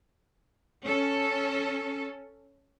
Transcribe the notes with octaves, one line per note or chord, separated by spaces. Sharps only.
C#4 A4